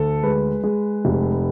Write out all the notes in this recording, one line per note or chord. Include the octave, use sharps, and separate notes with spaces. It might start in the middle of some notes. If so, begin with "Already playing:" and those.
Already playing: D2 A4
G#3 B4
G#3
F1